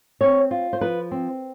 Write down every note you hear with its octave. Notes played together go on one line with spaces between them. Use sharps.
C4 C#5
F4
C5
F3 B4
C4